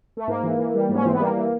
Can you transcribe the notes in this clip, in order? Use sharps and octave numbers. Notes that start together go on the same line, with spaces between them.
A3
G#2 A#3
E3
E3
G3
G#2
C#4
E3 C4
B3
G3 A#3
E3